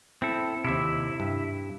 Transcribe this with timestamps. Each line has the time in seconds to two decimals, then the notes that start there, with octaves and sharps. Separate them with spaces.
0.22 C4 E4 A4
0.65 D#2 C3 E4 E5
1.20 G2